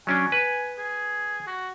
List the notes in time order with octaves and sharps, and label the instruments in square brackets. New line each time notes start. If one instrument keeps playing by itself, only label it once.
[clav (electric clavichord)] F#3 C#4 D4 [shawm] G#5
[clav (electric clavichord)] B4
[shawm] G#4
F#4